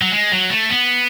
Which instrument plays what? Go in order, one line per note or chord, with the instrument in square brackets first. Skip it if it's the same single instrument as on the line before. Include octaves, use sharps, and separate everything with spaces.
[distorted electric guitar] F#3
G#3
F#3
A3
B3